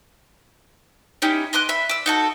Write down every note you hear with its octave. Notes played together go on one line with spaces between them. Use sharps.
C#4 D#4 E4 G4
D#5 C6 D6 F#6
E5 B5
D5 E6
D#4 F#4 A4